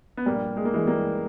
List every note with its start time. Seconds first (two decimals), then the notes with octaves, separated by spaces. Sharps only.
0.17 B3
0.26 A#1 A#2 G3 A#3
0.57 G#3
0.65 A#3
0.74 E3 G#3
0.87 G3 A#3